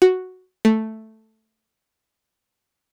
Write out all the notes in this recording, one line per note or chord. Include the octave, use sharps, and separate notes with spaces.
F#4
A3